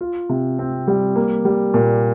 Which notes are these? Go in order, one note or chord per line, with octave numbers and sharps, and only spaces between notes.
F4
C3
C4
G3
A#3
G3
A#2